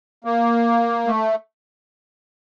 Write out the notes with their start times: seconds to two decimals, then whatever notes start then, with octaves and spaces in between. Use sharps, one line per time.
0.24 A#3
1.07 A3